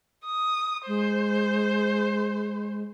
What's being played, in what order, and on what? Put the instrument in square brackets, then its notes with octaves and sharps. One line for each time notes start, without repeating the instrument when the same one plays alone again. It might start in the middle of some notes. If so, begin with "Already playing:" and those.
[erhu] D#6
[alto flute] G#3 [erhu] C5